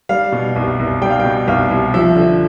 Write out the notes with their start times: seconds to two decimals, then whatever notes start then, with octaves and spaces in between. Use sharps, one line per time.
0.09 G3 F5
0.32 B2
0.56 C2
0.79 C2
1.01 G3 G5
1.10 F5
1.20 B2 G5
1.48 C2 F5
1.71 C2
1.94 F3 E5
2.16 D3